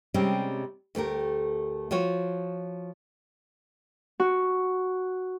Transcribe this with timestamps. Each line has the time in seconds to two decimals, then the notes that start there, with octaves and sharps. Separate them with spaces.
0.14 C3 G3 G#3 C4 C#4
0.95 D2 A3 G4 A#4
1.91 F3 F4 F#4 C#5
4.20 F#4